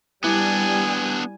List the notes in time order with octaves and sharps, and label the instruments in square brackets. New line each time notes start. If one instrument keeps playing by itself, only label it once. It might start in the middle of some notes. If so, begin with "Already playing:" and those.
[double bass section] G3 [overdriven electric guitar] B3 D4 [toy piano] E4 E5 D6 [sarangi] G#5